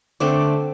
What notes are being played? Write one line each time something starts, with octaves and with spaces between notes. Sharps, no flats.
D3 A3 C4 D5